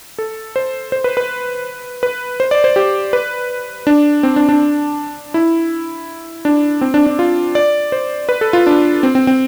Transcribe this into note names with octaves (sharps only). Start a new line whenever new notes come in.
A4
C5
C5
B4
B4
B4
C5
D5
C5
G4
B4
D4
C4
D4
D4
E4
D4
C4
D4
D4
F4
D5
C5
B4
A4
F4
D4
C4
C4
C4